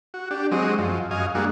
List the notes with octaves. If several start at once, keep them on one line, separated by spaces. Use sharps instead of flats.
F#4
D4 G4
F#3 G#3 C4 D#5
F#2 F3
F#2 D#5 F5 G#5
G3 G#3 A#3 D4 F#4